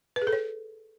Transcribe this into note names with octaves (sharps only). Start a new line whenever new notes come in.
B4
G#4
A4
C#5